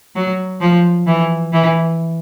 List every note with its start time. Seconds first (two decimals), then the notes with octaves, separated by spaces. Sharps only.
0.15 F#3
0.61 F3
1.07 E3
1.53 E3